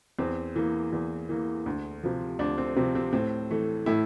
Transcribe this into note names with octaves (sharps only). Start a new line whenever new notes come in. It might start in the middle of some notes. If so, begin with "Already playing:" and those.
E2 C4
E3 A#3
E2
E3 A#3
D2
C3 F3
D2 D4
C4
C3 F3 C4
C4
A2 C4
E3 A3
A2 E4